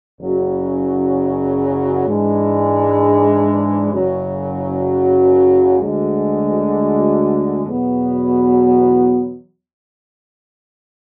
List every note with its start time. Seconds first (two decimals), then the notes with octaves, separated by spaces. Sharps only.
0.19 F#1 F#2 C#3 F#3
2.06 G#2 E3 G#3 D4
3.93 F#1 F#2 C#3 F#3
5.79 D2 D3 G#3
7.66 E2 B2 F#3 B3